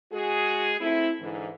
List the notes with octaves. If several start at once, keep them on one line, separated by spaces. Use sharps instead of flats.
G#3 F#4 G#4
A3 C4 E4
G#2 D3 E3